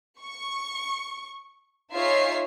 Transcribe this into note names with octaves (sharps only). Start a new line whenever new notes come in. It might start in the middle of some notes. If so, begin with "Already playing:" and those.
C#6
D#4 F4 G#4 C#5 E5 C7